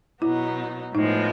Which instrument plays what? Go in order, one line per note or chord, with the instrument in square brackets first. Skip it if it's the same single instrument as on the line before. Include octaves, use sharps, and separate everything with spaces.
[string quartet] B2 F#3 B3 D#4 [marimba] E4
[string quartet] A2 F3 G#3 B3 [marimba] D#4